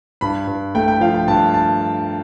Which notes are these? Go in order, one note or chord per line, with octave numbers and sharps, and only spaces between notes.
G2 B5
G2
A3 G5
G5
F3 F5
G5
G2 A5
A5